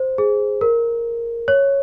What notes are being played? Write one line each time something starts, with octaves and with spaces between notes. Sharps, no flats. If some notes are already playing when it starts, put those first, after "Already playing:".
Already playing: C5
G#4
A#4
C#5